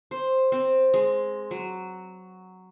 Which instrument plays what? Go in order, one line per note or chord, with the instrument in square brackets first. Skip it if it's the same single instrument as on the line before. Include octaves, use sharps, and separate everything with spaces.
[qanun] C5
C4
G#3
F#3